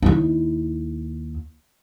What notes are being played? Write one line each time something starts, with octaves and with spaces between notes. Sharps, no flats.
D#2 E4